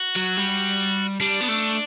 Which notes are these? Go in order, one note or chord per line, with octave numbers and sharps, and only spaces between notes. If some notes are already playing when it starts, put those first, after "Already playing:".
Already playing: F#4
F#3
G3
G3 D4
B3
A3